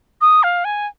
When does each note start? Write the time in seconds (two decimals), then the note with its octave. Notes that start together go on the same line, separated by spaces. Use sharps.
0.21 D#6
0.43 F5
0.65 G#5